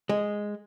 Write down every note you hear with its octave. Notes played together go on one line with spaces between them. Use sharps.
G#3